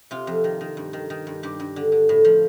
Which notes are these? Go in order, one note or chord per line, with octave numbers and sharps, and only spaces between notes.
C3 F4
F2
D#3
D#3
G2
D#3
D#3
G2
G2 G4
G2
D3
D3
A2
F3